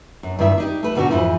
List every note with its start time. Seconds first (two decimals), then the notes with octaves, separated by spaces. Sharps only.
0.23 F#2
0.39 G2 D#3 G3 E4 E5
0.58 D4 D#4 G4
0.83 A3 B4
0.95 G#2 B2 D3 D#3 D4 F#4
1.10 F2 G#2 E3 F3 E4